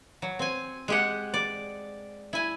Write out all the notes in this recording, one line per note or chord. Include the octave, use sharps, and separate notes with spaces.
F#3
C4 G#5
G#3 G4 F#5
D5
E4 G#5